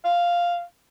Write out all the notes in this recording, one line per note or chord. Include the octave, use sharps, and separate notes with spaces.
F5